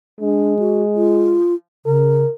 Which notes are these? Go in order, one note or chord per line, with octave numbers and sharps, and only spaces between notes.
G#3 D4
F#4
F4
C#3 A#4